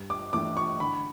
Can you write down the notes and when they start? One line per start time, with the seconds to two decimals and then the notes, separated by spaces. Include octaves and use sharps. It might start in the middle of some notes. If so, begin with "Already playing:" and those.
Already playing: G2
0.10 D6
0.33 E3 A3 D4 D6
0.57 C#6
0.80 D3 B5